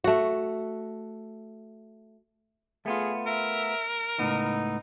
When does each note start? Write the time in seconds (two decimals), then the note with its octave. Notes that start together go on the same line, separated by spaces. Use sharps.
0.04 A3 F#4
2.86 A3 B3 F4 G#4
3.27 A#4 E5
4.19 C#2 A2 B3 D#4